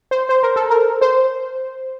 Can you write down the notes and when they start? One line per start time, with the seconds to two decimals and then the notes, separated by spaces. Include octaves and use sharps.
0.11 C5
0.29 C5
0.43 A#4
0.56 A4
0.70 A#4
1.01 C5